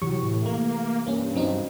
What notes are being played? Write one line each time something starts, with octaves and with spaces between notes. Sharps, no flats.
C3 E3 F#3 G4 C#6
A2
A3 A#3
G2 A#3 C#4
F#3 C4 C#4 D#4